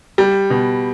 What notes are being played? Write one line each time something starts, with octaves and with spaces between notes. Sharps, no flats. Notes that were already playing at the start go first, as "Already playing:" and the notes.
G3
B2